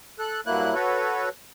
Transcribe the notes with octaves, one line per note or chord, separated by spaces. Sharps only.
A4 F#6
G2 F#3 A#3 E4 F#6
F#4 A4 B4 C#5